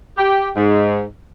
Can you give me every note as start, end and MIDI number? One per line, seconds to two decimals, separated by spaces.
0.18 0.49 67
0.56 1.04 44